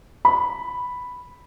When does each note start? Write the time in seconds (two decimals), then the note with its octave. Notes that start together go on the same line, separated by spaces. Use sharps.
0.25 B5